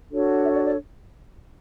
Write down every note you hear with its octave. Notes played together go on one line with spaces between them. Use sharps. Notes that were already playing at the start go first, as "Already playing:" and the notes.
D4 F#4 A4 C#5
E5
D5
D5